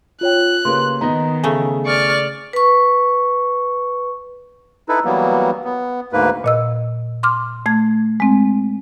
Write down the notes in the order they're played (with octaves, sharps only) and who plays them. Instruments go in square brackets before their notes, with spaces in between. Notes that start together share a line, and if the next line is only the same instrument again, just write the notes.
[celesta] F4 C#5 G5 [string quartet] F#6
[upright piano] C#3 A#3 [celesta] G4 B4 C6
[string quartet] D#3 [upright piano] B3 D#4 D#5 [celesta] A#5
[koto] C#3 A3 [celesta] G#5
[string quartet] D5 C#6 F6
[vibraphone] B4 C#6
[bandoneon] D#4 E4 A4 B4
E3 F#3 G3 A#3 B3
B3
D2 G#2 A#3 B4
[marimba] A#2 D#5 E6
C6 D6 F6
A3 G#6
G#3 C4